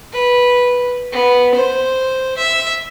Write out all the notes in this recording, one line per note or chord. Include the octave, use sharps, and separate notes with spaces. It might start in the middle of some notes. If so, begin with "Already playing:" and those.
B4
B3
C5
E5